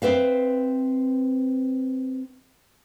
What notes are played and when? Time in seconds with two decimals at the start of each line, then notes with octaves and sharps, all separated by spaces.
0.02 C4 B4 E5 F5